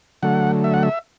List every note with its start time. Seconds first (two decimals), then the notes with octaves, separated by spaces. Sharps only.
0.23 D3 F#3 A3 F#5
0.64 E5
0.74 F#5
0.83 E5